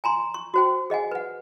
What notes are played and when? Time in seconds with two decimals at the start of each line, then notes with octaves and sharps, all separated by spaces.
0.04 G#5 A#5 C6
0.34 C#6
0.54 F#4 C5 G5
0.90 G#4 D#5 F#5 G#5
1.11 B4 F#5